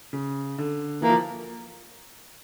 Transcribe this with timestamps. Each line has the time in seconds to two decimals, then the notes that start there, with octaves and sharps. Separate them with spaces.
0.13 C#3
0.58 D3
1.02 E3 A#3
1.09 F3